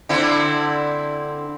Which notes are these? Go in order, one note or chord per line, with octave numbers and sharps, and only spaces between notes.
D3 C4 E4